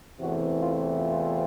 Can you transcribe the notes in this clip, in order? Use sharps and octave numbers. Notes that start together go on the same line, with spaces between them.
E2 C3 E3 A3 C4 F#4
F4
F4